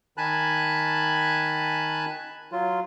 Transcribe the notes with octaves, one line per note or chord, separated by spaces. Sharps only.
D#3 G#5 A5 B5 F#6
F#3 F4